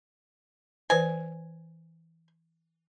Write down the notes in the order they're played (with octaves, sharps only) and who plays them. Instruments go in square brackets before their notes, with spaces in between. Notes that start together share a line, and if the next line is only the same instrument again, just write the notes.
[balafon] E3 B4 C5 [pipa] G#5